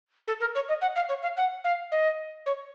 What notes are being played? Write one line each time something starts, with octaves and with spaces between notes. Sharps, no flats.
A4
A#4
C#5
D#5
F#5
F5
C#5
F5
F#5
F5
D#5
C#5